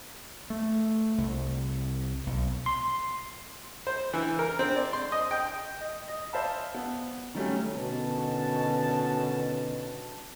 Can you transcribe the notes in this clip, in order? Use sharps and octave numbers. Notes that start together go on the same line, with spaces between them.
A3
C2
B1
C6
C5
E3
A#4
C4
D5
C6
D#5
G5
D#5
D#5
C5 D5 E5 F5 A5 B5
B3
D#3 F#3 G3 A3 C#4
B2 D3 D#3 B3 C#4 A5